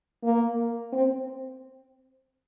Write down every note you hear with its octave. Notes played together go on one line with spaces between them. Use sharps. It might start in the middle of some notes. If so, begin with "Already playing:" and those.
A#3
C4